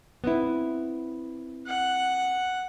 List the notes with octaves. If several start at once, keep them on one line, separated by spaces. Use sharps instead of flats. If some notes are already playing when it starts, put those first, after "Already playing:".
B3 C4 E4
F#5